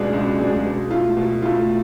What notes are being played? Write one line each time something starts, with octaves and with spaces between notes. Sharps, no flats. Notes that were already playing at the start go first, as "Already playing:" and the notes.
Already playing: C#2 B2 G#3 D4 G#4
C#2
B2 G#3 D4 G#4
B2
A3 F4
B2
A3 F4